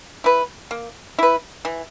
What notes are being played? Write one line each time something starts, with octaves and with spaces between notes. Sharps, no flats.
E4 B4
A#3
E4 B4
E3